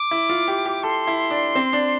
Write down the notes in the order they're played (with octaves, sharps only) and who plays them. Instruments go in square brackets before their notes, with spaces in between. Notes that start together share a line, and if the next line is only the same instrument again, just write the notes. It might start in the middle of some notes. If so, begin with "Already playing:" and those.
Already playing: [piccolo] D6
[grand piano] E4
F4
G4
G4
[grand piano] A4 [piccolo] C6
[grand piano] E4
D4
C4
D4